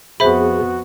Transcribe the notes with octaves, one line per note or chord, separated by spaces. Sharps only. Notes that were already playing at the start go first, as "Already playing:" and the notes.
F2 B3 F#4 G#4 C5 E5 B5